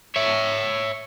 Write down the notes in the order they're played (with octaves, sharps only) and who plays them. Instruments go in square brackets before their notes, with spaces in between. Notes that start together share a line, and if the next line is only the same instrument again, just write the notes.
[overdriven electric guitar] C#5 E5